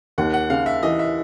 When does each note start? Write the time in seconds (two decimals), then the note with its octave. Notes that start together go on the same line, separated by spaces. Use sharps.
0.18 D#2 F#5
0.34 F#5
0.50 C#3 F5
0.66 E5
0.83 E3 D#5
0.99 E5